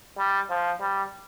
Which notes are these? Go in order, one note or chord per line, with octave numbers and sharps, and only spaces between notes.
G3
F3
G3